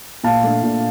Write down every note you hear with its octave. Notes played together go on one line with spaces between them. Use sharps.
A#2 F5 A5
A3 D4
A#2